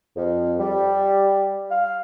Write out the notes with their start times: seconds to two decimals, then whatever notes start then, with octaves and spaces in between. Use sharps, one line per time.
0.16 F2
0.59 G3
1.70 F5